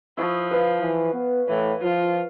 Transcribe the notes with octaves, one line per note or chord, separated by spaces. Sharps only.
F3 E4 C#5 D#6
B4 F5
E3
B3
A2 E3
F3 F4